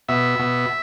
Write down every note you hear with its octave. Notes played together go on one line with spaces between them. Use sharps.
B2 E5
B2